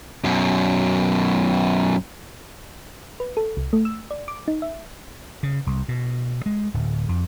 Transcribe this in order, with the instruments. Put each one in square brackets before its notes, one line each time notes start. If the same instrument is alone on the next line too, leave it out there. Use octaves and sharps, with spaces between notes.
[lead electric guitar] F#2 B2
[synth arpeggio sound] B4
A4
C2
A3
E6
D5
D6
D#4
E5
[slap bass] C#3
C2
B2
G#3
D1
F2